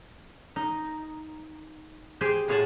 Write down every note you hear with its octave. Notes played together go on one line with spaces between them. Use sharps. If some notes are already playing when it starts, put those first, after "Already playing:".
D#4
G4 G#4 C5 G5
A2 G#3 G#4 C#5 F#5 A5